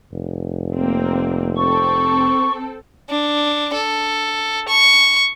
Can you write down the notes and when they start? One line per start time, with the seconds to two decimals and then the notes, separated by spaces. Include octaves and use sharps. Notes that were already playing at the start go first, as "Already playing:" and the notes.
0.12 F1
0.74 A#3 C4
1.57 C4 A4 C#6
3.10 D4
3.74 A4
4.68 C#6